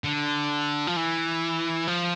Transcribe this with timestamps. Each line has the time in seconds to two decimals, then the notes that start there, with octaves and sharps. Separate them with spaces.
0.04 D3
0.87 F3
0.96 E3
1.87 F3